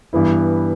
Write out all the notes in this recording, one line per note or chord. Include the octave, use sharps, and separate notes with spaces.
G2 E3 B3 E4